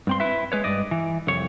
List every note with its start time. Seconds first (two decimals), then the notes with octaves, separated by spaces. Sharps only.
0.07 G2 C4 C6
0.20 E4 B4 E5
0.52 G#3 B4 C#5
0.64 G2 D5 D#5
0.91 E3
1.27 C2 F2 C#5